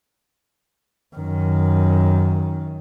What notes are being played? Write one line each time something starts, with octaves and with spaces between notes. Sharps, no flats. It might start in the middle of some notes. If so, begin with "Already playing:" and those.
F#2 D#3